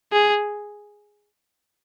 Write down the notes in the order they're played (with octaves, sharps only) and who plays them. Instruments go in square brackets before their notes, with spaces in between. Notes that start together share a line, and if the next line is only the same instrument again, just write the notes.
[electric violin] G#4